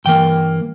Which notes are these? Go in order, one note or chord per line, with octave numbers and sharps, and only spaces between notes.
G2 E3 A#3 G5